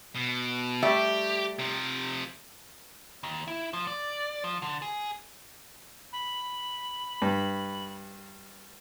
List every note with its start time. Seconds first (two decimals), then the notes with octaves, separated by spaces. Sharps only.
0.15 B2
0.83 G3 A3 G4 E5
1.59 C3 F3
3.23 D#2
3.48 E4
3.73 F3
3.87 D5
4.44 F3
4.62 D3
4.82 G#4
6.13 B5
7.22 G2